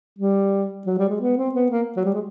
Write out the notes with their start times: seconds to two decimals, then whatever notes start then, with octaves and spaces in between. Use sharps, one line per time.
0.19 G3
0.86 F#3
0.98 G3
1.09 G#3
1.21 B3
1.37 C4
1.54 B3
1.71 A#3
1.97 F#3
2.05 G3
2.14 G#3